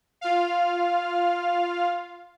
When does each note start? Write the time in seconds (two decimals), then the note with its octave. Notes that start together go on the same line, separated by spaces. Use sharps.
0.21 F4 F5